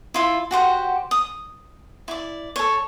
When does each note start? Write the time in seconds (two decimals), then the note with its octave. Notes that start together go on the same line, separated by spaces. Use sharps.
0.14 E4 F4 E5
0.51 F#4 G4 C5 F#5
1.11 D#6
2.08 E4 D5
2.56 A4 C#5